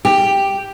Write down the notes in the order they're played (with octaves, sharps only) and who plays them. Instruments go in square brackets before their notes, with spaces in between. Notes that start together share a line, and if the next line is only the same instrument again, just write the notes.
[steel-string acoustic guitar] G4